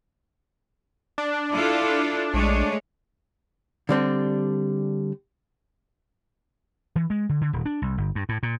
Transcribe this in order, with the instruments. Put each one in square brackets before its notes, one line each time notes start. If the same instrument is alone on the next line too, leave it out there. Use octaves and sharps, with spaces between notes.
[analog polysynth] D4
[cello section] E4 F4 A4
[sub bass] A#1 [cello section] G#3 A3 C#5
[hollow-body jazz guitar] D3 G3 C4 D4
[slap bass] E3
G#3
D3
D3
D#1
D4
C2
G1
G2
A2
A#2